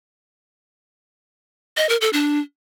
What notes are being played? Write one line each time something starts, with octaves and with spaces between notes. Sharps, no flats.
D#5
A#4
A4
D4